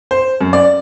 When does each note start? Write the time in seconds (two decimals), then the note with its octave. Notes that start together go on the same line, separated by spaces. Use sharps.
0.11 C5
0.41 F#2
0.53 D5